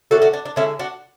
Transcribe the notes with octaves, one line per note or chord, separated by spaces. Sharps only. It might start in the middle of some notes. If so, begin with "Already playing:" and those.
D3 A3 C#4 F#4 A4
D4 F#4
D4
D4
D3 G#3 C#4 E4
D4 F#4